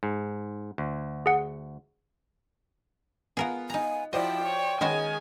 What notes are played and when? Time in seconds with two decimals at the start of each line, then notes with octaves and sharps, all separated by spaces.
0.03 G#2
0.78 D2
1.26 G#4 F#5
3.37 B3 F4 G#4 A#4 F#5
3.70 D#4 G#5 A#5
4.13 F3 E4 F#4 C5 D5 D#5 G5
4.43 C#5
4.81 D#3 G#3 B3 C#4 F#4 G#4 G#5 G#6